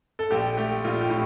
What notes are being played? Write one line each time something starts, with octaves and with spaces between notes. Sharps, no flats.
A4
A#1 G4
A3 G4
A#1 F4
G4
A2